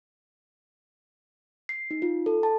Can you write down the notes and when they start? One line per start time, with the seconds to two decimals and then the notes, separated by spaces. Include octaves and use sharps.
1.69 C7
1.91 D#4
2.02 F4
2.26 A4
2.43 A5